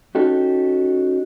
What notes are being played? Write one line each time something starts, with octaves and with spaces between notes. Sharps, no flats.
C#4 D#4 F#4 G4 A4